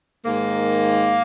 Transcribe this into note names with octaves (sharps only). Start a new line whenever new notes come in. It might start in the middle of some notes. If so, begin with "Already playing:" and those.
G#2 D#3 A#3